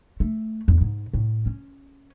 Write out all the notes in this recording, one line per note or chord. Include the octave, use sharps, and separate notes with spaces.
A3
E2
G#2
A2
C#4